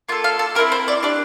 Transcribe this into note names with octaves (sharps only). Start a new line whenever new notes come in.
A#3 F4 A4
F5
A4
C4 E4 G4 A#4
C5
D5
D4 G4 D5